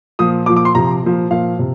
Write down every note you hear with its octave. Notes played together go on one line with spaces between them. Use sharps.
A#2 F3 D#6
A#2 F3 D6
D6
C6
C3 F3 A#5
A#2 F3
A#2 F3 F5
C3